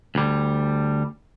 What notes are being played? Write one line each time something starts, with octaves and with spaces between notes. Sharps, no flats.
D2 G3